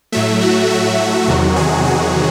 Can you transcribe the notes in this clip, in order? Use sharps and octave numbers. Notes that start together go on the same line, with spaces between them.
A2 F#3 A3 E5
F#4
F#4
E2 C3 D#3 F#3
G#4
F#4